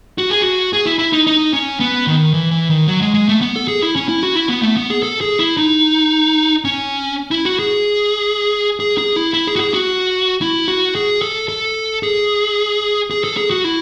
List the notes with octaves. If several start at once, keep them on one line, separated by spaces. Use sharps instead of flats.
F#4
G#4
F#4
G#4
E4
E4
D#4
D#4
C#4
B3
D#3
E3
E3
D#3
F#3
G#3
G#3
A3
B3
A4
G#4
E4
C#4
E4
F#4
E4
B3
A3
B3
G#4
A4
G#4
E4
D#4
C#4
E4
F#4
G#4
G#4
G#4
E4
E4
G#4
F#4
G#4
F#4
E4
F#4
G#4
A4
A4
G#4
G#4
A4
G#4
F#4
E4